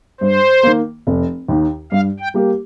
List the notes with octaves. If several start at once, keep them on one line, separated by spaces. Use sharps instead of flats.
G2 C5
D#3 A#3
F1
D#2 D#3
G2 F5
G5
G3 A#3 G4